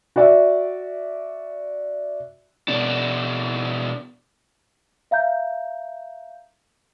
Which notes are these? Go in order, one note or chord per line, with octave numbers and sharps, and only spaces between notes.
F#4 D5 E5
B2 D4
E5 F5 A#5 G6